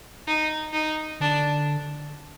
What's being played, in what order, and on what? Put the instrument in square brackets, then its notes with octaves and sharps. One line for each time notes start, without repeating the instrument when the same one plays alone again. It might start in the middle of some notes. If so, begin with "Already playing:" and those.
[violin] D#4
D#4
[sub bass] D3 [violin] D4